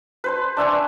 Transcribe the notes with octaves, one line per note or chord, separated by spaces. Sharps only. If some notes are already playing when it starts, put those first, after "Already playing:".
B4 C5 A5
D4 E5 G#5 C#6